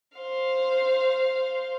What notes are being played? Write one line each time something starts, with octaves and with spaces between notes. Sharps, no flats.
C5 F5